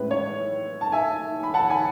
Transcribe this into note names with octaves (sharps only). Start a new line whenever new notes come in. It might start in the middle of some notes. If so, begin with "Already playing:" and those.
Already playing: A2 G#3 C#4 E4 B4
C#5
A5
E5 G#5
B5
F#5 A5
G#5 B5